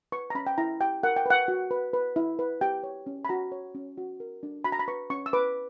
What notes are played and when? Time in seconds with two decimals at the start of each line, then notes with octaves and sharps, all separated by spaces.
0.12 B4 C#6
0.30 A#5
0.35 C#4 B5
0.47 G5
0.58 E4 A#5
0.81 G4 G5
1.03 A#4 F#5
1.16 G5
1.26 B4 F#5
1.48 F#4
1.71 B4
1.93 B4
2.16 E4
2.39 B4
2.61 G4 G5
2.83 C#5
3.07 C#4
3.25 B5
3.29 F#4 A#5
3.52 C#5
3.75 C#4
3.98 F#4
4.20 A#4
4.43 D4
4.64 F#4 B5
4.72 A#5
4.79 B5
4.88 B4 C#6
5.10 C#4 C#6
5.26 E6
5.33 B4 D6